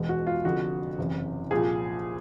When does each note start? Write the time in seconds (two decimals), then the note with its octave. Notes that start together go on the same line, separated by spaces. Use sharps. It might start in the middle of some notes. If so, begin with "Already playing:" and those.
Already playing: E1 E2 B2 G#3
0.09 F#4
0.27 F4
0.45 F1 F2 D3 F3 F#4
0.98 F#1 E2 C3
1.51 C2 A#2 F3 G#4